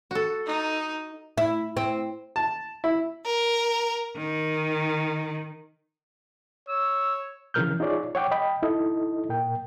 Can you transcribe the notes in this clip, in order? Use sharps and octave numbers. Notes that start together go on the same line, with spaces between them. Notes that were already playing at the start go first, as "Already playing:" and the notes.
F#4 A4
D#4
E4
C4
A5
E4
A#4
D#3
C#5 E6
C#3 E3 F3 A#4 F6 G6
D#4 F4 G#4 C#5 D5
C#5 F#5 G5 D6
D#5 G5 B5
D#4 E4 A4 D#5
A#2 A#4 G5